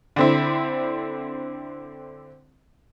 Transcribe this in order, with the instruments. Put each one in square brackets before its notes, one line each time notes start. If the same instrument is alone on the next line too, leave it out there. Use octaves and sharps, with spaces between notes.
[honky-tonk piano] D3 C4 E4